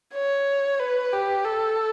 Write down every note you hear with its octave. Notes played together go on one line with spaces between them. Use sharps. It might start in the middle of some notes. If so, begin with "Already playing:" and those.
C#5
B4
G4
A4